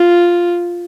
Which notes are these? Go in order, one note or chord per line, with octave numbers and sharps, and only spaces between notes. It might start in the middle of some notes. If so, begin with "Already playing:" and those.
Already playing: F4